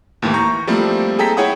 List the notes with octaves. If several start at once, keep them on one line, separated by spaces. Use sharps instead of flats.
D#2 A2 E3 A#3
A#5 C#6 G6
F3 G3 A3 A#3 C4 E4
G#4 A4 G5 A#5 B6
E4 G#4 C#5 F#5 G5 D#6